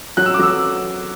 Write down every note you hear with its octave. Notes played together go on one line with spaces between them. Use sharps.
F#3 F#6
E6
D6
F#3 E6